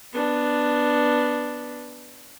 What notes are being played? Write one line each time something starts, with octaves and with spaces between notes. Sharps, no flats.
B3 D4